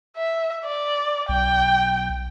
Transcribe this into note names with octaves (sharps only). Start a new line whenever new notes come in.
E5
D5
B1 G5